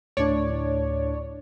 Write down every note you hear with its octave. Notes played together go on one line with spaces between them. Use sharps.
D2 A2 D4 C#5 D5